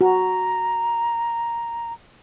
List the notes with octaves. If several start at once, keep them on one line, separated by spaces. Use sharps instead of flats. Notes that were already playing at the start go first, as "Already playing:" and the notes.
F#4 A#5